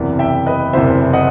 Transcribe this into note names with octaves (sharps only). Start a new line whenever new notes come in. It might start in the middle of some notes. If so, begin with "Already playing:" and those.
Already playing: F#1 E2 C3 E3
E5 G5
B4 D#5
F#1 E2 C3 E3 C5 E5
D#5 F#5